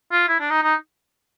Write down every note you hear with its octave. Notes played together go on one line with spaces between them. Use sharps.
F4
E4
D4
D#4
D#4